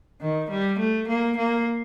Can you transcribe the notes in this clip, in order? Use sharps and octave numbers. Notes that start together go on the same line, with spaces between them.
D#3
G3
A3
A#3
A#3